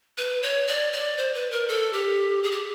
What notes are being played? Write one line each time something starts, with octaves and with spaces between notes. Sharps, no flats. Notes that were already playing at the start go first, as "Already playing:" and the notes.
B4
C#5
D5
D5
C5
B4
A#4
A4
G4
G#4
G4